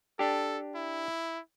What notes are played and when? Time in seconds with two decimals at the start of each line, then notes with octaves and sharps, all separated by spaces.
0.19 D4 G4 A4
0.76 E4